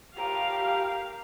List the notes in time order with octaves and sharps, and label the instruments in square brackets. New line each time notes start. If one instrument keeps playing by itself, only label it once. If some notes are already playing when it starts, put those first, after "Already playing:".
[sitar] A2 F4 A4 [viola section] G4 F5 [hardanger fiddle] A#4